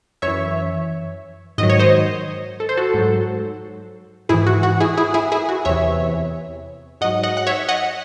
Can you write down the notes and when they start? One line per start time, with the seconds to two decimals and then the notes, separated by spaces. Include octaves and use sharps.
0.22 F#2 E3 C#5 E5
1.58 G#2 D#3 F#3 D#5
1.70 C#5
1.79 C5 D#5
2.60 A4
2.69 C5
2.77 F#4 A4
2.94 G#2 F#3
4.29 G#2 E3 E4 G#4
4.47 F#4
4.63 F#4
4.80 E4 G#4
4.97 E4 G#4
5.14 E4 G#4
5.32 E4 G#4
5.49 F#4
5.65 E2 C3 E3 C#5 E5
7.01 G#2 D#5 F#5
7.05 F#3
7.23 D#5 F#5
7.37 F#5
7.47 C#5 E5
7.69 D#5 F#5